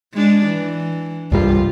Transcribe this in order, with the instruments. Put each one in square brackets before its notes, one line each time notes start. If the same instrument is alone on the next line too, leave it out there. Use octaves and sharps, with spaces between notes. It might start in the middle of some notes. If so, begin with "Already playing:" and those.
[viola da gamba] G#3 D4
E3
[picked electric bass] C2 G2 G3 [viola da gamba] F4